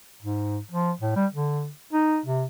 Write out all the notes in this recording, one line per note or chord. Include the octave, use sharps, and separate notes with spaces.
G#2
F3
A2
G3
D3
D#4
C3